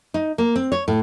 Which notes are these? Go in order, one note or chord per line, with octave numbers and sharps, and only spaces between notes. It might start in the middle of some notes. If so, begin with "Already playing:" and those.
D#4
A#3
C4
C#5
A2